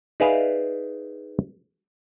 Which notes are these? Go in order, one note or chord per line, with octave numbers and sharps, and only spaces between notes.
D#4 G#4 B4 D5 E5 F5